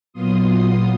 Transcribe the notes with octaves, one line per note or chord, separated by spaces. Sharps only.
A#2 F#3 B3 F4 C6 D#6